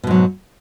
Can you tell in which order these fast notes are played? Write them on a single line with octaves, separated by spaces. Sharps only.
B2 G#2 F#3